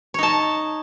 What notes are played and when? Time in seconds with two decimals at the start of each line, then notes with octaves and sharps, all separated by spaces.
0.14 C#5
0.19 D#4
0.23 A5